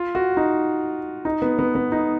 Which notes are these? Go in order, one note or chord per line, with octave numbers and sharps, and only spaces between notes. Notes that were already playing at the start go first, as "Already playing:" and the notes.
Already playing: F4
F#4
D#4
D#4
B3
B3
B3
D#4